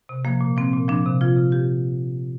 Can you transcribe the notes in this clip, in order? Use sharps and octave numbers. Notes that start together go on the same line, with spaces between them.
C3
F3 A#3
A#2
F3 C4
A#2
F3 D4
C3
F3 F4
C3
F3 G4